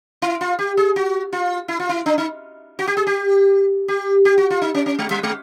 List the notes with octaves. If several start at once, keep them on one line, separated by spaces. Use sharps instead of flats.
E4
F4
G4
G#4
F#4
F4
E4
F4
E4
D4
D#4
F#4
G4
G#4
G4
G4
G4
F#4
F4
D#4
C#4
C#4
G#3
G3
G#3